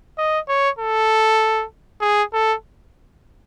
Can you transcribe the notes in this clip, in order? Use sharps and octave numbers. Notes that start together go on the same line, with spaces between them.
D#5
C#5
A4
G#4
A4